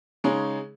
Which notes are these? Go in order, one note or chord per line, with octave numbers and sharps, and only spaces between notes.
C#3 G#3 D#4 G#4 C#5